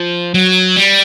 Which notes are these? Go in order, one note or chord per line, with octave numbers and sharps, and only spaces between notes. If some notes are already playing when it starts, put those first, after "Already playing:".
Already playing: F3
F#3
G3